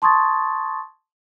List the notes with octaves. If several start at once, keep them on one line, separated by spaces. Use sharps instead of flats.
A5 C6 C#6 D#6 G#6 A6